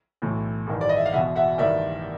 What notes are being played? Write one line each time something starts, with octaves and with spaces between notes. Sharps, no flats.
B1 A2 E3
A1 G2 D#3
D5
D#5
E5
F5
E1 E2 B2 E5 F#5
E5 F#5
A1 G2 D#3 D5 E5